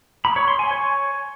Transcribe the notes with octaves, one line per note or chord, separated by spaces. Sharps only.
B5
C#5
C6
G#5
C#5